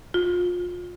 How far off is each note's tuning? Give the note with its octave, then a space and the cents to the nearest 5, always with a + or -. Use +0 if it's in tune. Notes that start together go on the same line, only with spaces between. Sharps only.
F4 +30